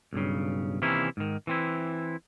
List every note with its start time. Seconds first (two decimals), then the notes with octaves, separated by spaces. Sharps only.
0.13 B1 G2 C#3
0.82 C3 D#3 E3 A#3 C#4 E4
1.17 G#2 D#3
1.47 E3 C4 E4